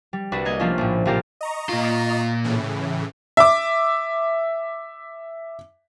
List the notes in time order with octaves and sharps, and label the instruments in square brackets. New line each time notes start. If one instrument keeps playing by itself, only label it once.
[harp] G3
C2 D4 F#4 B4
A#3 D#5 G#6
F3 A3 A#3 C#4 D4 F4
A#1 A2
A#1 C3 F4 G4 A#4 C5
[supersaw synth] D#5 A#5 C#6
[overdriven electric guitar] A#2 F4
[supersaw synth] A2 C#3 E3
[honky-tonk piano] E5 D6